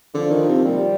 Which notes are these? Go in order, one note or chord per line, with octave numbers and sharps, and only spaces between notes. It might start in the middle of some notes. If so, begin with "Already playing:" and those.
D3 F3
D#3
C3
A#2 G3